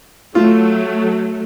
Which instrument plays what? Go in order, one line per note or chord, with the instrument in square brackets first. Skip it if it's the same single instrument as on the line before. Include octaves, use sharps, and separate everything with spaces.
[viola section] F#3 A3 [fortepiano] F4